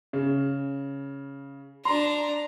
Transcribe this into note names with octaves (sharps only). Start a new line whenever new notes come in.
C#3
D4 A#5 C6